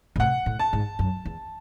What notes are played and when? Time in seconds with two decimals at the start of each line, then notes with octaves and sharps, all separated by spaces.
0.16 A2
0.20 C3 F#5
0.46 A2
0.59 A5
0.73 G#2
0.99 F#2
1.25 E2